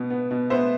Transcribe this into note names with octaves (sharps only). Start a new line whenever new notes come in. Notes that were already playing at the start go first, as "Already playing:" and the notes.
Already playing: B2 B3
B3
B2
B3 C5 E5